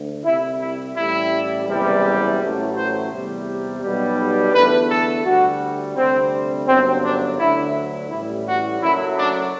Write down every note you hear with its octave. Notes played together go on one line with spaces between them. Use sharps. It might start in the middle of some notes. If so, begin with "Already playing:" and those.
Already playing: D2
C2 C3 G3 E4
E4
A1 A2 G3 E4
F#1 E2 C3 E3 G3
A1 A2 F#3 A3
C5
E2 C3 G3
B1 B2 G3
E2 D3 A3 B4
A4
D2 D3 G3 F#4
D2 C3 G3 C4
G1 F#2 F#3 C4
D4
D2 D3 F#3 E4
A1 A2 E3 G3 E4
F#4
F#1 F#2 F#3 A3 E4
D4